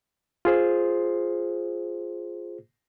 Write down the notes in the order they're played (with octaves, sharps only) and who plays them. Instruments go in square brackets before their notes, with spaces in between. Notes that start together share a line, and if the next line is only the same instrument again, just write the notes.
[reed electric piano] F4 G#4 C5